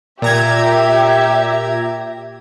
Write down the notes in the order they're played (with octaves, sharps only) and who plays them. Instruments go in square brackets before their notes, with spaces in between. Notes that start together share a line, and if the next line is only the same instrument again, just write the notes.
[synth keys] A#2 A#5 G#6 [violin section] G4 E5